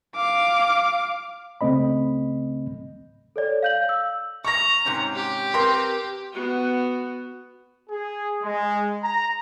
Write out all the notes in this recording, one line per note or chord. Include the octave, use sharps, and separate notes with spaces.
F5 D6
C#2 C#3 A3 C4 D#5 B5
A4 C#5 D5
F5 G6 F#7
E6
A#5 C#6 A#6
G#2 C3 C#4
G4
C4 A#4 B4 C6
B3 F#4
G#4
G#3
A#5